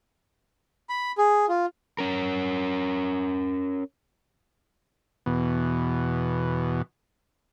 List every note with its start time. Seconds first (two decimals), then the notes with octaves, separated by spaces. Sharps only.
0.89 B5
1.18 G#4
1.49 F4
1.99 C#4 A#4
5.26 E2 B2